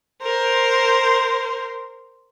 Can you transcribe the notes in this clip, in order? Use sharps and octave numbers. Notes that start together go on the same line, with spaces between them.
A#4 C5